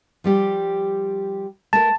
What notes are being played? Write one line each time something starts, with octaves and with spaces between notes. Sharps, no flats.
F3 G3 G4
A3 A#4 A5